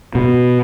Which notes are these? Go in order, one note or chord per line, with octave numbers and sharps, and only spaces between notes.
B2